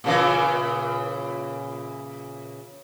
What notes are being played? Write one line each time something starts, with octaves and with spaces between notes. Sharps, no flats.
A#2 C#3 E3